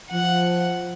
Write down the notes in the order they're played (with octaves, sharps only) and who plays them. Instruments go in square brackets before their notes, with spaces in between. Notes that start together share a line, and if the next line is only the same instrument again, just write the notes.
[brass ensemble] F3 [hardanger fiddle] F#5